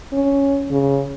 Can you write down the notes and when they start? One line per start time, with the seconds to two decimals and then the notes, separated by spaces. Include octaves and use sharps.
0.13 C#4
0.71 C#3